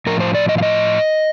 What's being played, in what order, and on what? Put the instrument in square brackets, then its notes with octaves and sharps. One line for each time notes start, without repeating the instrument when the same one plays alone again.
[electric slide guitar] A2 F3 A#4
C5
D5
D#5
F5
D#5